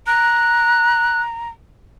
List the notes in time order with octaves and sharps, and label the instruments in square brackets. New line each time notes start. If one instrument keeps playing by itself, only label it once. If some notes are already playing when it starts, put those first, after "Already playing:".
[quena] A#5 [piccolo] F#6